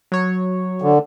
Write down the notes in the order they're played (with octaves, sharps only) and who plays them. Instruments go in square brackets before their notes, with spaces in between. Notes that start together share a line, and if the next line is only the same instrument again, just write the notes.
[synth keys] F#3 C#5
[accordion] D3